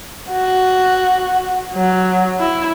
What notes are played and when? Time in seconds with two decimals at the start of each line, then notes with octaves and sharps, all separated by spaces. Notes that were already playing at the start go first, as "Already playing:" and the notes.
0.31 F#4
1.74 F#3
2.40 E4